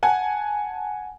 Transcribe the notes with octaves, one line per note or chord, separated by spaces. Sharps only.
F#5 G#5 A5